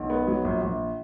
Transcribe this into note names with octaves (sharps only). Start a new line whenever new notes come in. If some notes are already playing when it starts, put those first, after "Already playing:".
Already playing: B1
B3
F#3
A#1
A#1